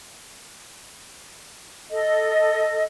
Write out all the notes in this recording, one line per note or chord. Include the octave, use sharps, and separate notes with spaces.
A4 D#5